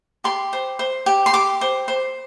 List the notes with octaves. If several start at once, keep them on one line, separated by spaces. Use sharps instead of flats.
G4 C6
C5
C5
G4
C6
G4 D6
C5
C5